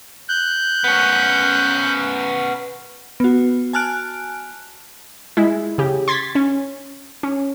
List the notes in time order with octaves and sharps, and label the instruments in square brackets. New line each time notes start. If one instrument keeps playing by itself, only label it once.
[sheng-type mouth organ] F#6 G6
[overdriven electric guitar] B3 C#4
[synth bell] B3 F#4
G#5 A5 F6 F#6 D7
[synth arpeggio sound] G#3 E4
C#3 G4
C6 G#6 A6 B6
C#4
C#4